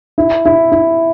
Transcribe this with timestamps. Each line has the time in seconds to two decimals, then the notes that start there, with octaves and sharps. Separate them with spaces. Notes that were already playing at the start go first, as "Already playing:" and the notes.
0.18 E4
0.45 E4
0.72 E4